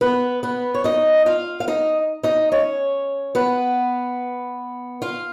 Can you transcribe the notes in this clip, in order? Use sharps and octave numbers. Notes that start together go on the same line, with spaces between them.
B3 B4
B3 B4
C#5
D#4 D#5
F4 F5
F5
D#4 D#5
D#4 D#5
C#4 C#5
B3 B4
F4 F5